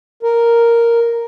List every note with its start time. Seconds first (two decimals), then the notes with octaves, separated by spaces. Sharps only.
0.23 A#4